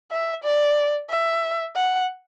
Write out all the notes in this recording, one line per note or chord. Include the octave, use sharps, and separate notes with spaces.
E5
D5
E5
F#5